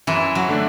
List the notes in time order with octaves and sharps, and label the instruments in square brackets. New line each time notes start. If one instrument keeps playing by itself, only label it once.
[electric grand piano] F#2 [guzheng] E3
[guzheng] F#3
[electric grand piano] D3 A3 D4